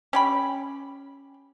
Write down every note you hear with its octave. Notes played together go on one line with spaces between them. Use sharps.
C#4 G4 B5